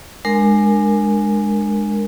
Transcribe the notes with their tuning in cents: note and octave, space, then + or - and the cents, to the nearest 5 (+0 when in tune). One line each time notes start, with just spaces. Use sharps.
G#3 +0 D4 +30 A#4 +0